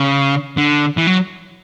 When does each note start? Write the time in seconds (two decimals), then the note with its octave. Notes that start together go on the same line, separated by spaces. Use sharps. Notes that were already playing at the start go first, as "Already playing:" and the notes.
Already playing: C#3
0.57 D3
0.97 E3
1.07 F#3